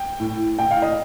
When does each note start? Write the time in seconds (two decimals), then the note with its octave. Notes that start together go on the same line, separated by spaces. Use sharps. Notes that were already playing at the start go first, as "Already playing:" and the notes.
Already playing: G5
0.20 A2
0.59 A2 G5
0.71 F5
0.82 D#5